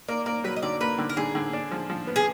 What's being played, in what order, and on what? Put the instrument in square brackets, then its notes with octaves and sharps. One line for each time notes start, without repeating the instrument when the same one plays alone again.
[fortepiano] A#3 [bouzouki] D5
[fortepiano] A#3 [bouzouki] D5
[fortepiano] F#3 [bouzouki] B4
[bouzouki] D#5
[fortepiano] D3 [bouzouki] D5
[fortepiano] A#3 [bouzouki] B4
[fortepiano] D3
[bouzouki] A#4
[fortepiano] D3 [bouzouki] G#4
[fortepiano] D3
D4
F3
F3
B3
[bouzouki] G#4